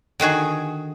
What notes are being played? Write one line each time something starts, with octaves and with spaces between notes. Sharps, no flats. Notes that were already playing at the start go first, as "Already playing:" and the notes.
D3 D#3 F#4 G#4